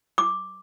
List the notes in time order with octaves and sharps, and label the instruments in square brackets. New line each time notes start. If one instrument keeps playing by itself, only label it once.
[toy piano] D6